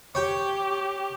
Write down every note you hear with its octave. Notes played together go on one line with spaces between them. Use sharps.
G4 C#5 G5